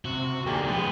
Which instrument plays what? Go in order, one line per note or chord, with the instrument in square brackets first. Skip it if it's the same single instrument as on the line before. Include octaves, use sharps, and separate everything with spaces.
[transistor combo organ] C3 [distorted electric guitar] F#4
[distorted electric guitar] D#2 D3 [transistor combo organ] A#3 G4 G#4
[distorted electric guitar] F3 B3 [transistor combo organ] G#3 G4